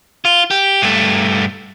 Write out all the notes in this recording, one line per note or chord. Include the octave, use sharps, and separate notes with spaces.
F4
G4
G2 A3